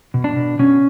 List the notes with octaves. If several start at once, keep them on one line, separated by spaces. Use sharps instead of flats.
B2
D4
B2
B2 C#4